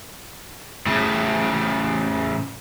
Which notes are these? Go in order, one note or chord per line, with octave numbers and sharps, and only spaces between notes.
A2 C#3